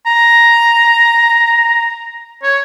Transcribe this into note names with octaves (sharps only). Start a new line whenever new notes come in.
A#5
C#5